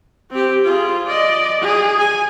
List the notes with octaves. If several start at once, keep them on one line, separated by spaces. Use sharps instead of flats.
C4 G4
F4 G#4
D5 D#5
G#4
G#5